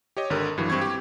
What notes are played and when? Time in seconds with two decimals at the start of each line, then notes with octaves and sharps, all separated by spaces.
0.17 G4 C#5 D#5
0.30 G#1 D3 A#4
0.58 G2 E3 F#3
0.70 G2 C4 C#6 G#6
0.81 G4